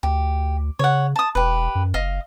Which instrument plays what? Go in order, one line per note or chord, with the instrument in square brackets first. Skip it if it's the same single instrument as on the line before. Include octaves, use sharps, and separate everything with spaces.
[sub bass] D2 [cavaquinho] G4
[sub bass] C#3 [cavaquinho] C#5 F#5
[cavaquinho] A5 D#6
[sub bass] E1 [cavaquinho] G4 B4
[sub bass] F#2
[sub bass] F#1 [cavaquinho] D#5 F5